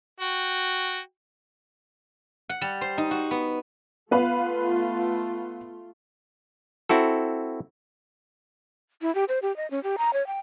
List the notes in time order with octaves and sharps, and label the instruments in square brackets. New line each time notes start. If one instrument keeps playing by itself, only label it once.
[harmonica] F#4 G5
[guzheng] F#5
G3
C5
D#4
F#4
B3
[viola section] A3 F4 [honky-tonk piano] B3 B4 F5
[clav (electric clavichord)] C4 E4 F#4 A4
[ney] E4
G4
C5
G4
D#5
C#4
G4
A#5
C#5
G5